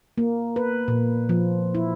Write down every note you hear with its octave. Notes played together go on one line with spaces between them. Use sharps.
A#3
B4
A#2
F3
E4